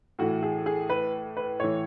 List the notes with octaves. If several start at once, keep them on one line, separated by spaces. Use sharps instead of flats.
A2 E3 F#4
G#4
G#4
B4
B4
A2 E3 C#5